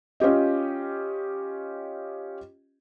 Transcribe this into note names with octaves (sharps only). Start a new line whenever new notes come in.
C#4 F4 G4 D#5